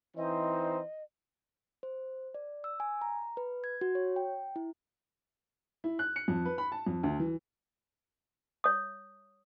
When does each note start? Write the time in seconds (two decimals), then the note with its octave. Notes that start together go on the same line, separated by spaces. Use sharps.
0.17 E3 C4 D#4 C5 D#5
1.83 C5
2.34 D5
2.64 E6
2.80 G#5
3.02 A#5
3.37 B4
3.64 G#6
3.81 F#4
3.95 C#5
4.16 G5
4.56 E4
5.84 E4
5.99 F#6
6.16 C#7
6.28 F2
6.45 B4
6.58 B5
6.72 A5
6.86 F2
7.03 D2
7.20 E3
8.64 C#5 D#6